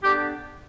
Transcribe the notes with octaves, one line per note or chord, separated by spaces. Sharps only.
D3 B3 D4 G4